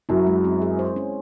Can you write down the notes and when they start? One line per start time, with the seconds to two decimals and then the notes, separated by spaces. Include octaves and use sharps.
0.09 F#2 F#3 E4
0.27 G#3
0.44 C4
0.62 G#4
0.79 C5
0.96 C#4